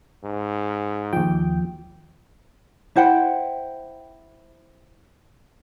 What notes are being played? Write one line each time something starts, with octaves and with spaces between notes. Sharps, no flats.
G#2
D#2 F3 G5
E4 C5 F#5 G5